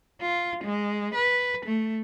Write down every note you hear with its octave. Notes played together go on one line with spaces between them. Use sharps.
F4
G#3
B4
A3